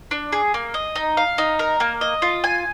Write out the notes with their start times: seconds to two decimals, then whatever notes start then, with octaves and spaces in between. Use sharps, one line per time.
0.11 D4
0.32 G#4
0.54 A#3
0.74 D#5
0.96 D#4
1.17 F5
1.38 D#4
1.59 A#4
1.80 A#3
2.01 D#5
2.22 F4
2.44 G#5